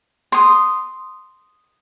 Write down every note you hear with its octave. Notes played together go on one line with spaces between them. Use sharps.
C6 D#6